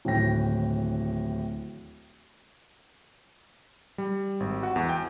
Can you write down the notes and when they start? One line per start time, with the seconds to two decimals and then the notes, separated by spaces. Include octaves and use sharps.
0.05 D1 D#2 A2 G5 A#6
3.98 G3
4.40 G#1
4.63 F#4
4.76 E2
4.89 G5